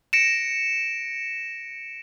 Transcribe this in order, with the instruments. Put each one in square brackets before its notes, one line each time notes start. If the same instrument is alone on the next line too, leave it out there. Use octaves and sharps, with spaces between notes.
[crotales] A#6 C#7 D7 E7